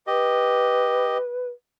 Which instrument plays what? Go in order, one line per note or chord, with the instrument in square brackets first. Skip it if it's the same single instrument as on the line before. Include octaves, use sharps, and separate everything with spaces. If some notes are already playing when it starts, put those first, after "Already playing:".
[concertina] G4 D#5 [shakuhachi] B4